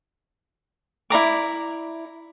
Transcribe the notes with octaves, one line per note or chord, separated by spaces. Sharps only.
E4 D5 A#5 D6